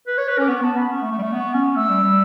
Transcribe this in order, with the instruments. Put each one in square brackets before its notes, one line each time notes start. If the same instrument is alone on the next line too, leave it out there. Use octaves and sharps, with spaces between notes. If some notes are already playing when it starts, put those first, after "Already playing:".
[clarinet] B4
C#5
B4
[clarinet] C#4 [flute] D6
[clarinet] B3 [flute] C#6
[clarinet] B3 [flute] A5
[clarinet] B3 [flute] B5
[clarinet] C#4 [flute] C#6
[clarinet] A3
A3
G3
A3
B3
C#4
[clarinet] A3 [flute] E6
[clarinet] G3
G3